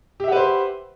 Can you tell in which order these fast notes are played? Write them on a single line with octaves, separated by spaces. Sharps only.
G4 E5 F#5 B4 C5